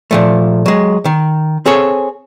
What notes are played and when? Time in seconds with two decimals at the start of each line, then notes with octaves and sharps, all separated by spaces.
0.11 A#2 F3 A3
0.66 F#3 G#3
1.05 D#3
1.66 C4 G#4 A4 C#5